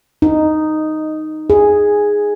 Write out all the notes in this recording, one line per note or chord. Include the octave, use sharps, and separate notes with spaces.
D#4
G#4